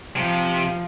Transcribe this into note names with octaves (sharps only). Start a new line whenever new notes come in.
C3 F3